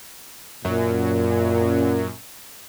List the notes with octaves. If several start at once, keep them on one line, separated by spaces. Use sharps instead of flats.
F#2 A#2